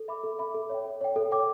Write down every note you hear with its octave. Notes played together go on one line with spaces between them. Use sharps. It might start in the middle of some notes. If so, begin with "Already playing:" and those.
Already playing: A4
E5 B5 D6
A4
E5 B5 D6
A4
C#5 E5 G5
A4
C#5 E5 G5
A4
C#5 G5 D6